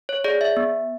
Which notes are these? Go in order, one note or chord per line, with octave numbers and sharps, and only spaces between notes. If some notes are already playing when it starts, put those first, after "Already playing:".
C#5
G#4 D5
E5
B3